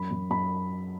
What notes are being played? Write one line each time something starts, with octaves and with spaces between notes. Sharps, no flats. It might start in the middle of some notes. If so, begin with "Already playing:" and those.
Already playing: F#2 B5
F#2
F#2 B5